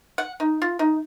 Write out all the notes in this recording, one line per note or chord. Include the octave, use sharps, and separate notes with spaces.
F#5
D#4
F4
D#4